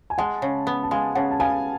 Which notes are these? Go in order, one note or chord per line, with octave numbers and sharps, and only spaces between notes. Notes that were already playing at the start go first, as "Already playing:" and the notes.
G#5
G#3 F#5 A5
C#3
B3
A5
G#3 F5 G#5
C#3 F#5 A5
A5
B3 F5 G#5